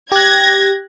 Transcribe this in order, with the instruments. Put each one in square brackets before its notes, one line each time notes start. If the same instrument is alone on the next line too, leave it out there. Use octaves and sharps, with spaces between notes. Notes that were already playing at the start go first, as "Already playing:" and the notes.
[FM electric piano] G4 F#6 [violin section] G#6 A#6